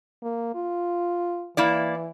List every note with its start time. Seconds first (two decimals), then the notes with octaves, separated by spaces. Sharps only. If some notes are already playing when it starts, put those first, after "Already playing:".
0.23 A#3
0.55 F4
1.57 E3 A#3 E4 D5